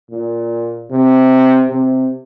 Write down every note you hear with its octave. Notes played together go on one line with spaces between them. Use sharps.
A#2
C3
C3